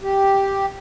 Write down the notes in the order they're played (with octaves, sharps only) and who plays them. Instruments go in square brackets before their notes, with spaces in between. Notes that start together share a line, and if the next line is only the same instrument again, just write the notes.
[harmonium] G4